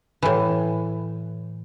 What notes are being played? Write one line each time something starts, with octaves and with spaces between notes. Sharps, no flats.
A2 E3